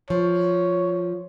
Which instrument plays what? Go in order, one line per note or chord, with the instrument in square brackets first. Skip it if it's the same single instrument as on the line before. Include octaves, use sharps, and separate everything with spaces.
[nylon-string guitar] F3 [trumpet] C#5